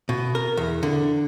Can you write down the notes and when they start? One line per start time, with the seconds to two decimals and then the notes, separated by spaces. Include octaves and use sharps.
0.09 B2
0.35 A#4
0.57 E2
0.83 D3